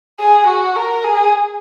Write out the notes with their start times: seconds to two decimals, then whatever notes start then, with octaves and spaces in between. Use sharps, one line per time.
0.20 G#4
0.48 F#4
0.76 A#4
1.04 G#4